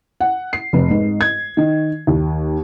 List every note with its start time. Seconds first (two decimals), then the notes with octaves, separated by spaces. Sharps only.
0.21 F#5
0.53 C7
0.73 F1
0.90 G#2
1.21 G#6
1.57 D#3
2.07 D#2